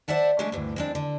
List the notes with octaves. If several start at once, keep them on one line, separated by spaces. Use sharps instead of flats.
C5 D5 E5 F#5 A5
C#3 G#3 A3 C#4 D4
D2 G2 E3
G#3 C4 D4
D3